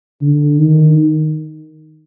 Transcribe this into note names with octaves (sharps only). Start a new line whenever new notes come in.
D3
D#3